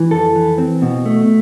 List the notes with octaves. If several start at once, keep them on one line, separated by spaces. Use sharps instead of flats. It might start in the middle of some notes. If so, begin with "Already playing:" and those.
Already playing: E3
F2 A4
E3
C4
B2
A3